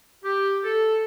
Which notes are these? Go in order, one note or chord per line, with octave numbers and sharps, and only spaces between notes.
G4
A4